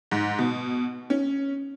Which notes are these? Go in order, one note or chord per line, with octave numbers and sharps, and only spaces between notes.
G#2
B2
C#4